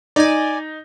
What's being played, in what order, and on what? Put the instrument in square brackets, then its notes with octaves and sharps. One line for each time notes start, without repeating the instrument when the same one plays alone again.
[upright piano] D#4 [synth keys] D5 G#5